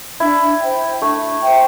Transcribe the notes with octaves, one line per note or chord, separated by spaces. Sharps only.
D4 E4
C5 E5 G5
A3 D4
C5 E5 G5